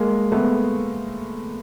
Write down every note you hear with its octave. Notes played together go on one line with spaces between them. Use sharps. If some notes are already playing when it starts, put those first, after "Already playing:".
Already playing: G#3 A#3
A3 B3